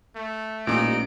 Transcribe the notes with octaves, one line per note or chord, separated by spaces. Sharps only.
A3
A1 A#2 G3 D#4 D7